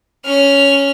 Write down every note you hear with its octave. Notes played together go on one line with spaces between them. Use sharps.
C#4 F6